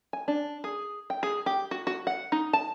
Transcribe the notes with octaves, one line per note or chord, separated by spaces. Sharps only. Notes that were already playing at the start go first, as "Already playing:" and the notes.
G#5
D4
G#4
G5
G#4
G4
F#4
F#4
F#5
D#4
A5